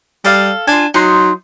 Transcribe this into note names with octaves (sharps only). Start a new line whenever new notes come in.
G3 A4 F5
D4 F4 G#5
F#3 D#4 C6